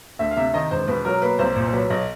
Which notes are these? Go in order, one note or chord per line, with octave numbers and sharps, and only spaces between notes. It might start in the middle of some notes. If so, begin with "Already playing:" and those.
D2 E5
F5
C3 E5
D#3 D#5
E1 C5
B2 B4
F#3 A#4
A#3 B4
C2 C5
A#2 C5
C5
F#3 B4
B1 D#5